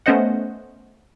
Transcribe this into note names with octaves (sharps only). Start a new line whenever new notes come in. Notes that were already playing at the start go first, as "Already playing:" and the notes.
A3 B3 C#4 C5 D#5 F#5